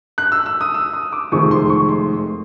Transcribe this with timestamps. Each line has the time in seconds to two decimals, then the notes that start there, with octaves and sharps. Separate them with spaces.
0.18 F#6
0.32 E6
0.46 E6
0.61 D#6
0.75 E6
0.94 D#6
1.12 D6
1.32 F1 F2 C3 D#3 G#3 C#6
1.51 C6
1.70 C#6
1.89 C6